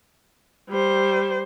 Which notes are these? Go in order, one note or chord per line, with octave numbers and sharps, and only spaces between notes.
G3 C5